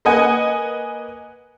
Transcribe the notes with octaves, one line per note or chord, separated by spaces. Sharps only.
A#3 B4 D#5 F#5 G#5